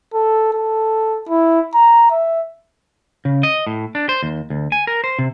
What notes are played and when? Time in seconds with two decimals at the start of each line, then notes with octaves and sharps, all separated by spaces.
0.14 A4
0.53 A4
1.29 E4
1.75 A#5
2.11 E5
3.25 C#3
3.43 D#5
3.67 A2
3.95 D4
4.09 C5
4.23 D#2
4.50 D2
4.72 G#5
4.87 A#4
5.04 C5
5.19 C3